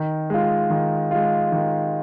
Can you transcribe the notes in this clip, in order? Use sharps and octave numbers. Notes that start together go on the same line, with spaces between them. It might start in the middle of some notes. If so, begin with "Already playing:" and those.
Already playing: D#3
G#3 F4
D#3
G#3 F4
D#3